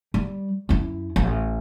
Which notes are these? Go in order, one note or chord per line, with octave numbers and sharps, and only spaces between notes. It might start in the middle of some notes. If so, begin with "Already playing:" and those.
G3
F#2 E4
A1